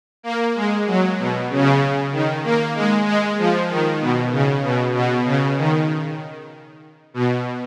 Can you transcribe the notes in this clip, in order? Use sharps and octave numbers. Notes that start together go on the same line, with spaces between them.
A#3
G#3
F#3
B2
C#3
D#3
A#3
G#3
G#3
F3
D#3
B2
C#3
B2
B2
C#3
D#3
B2